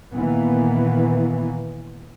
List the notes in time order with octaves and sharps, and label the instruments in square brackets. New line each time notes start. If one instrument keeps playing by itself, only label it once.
[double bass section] A#2 D#3 E3 A#3 B3